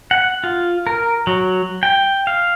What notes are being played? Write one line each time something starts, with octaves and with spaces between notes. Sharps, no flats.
F#5
F4
A#4
F#3
G5
F5